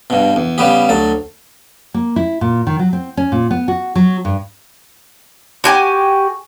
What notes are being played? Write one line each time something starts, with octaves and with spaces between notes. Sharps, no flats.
G2 B2
E2
C#3 G3 B3 G4
D2 F#3 A5
A#3
E4
A#2
D#3
F#3
C4
C#4
A#2
B3
F#4
F#3
G2
F#4 G4 G#5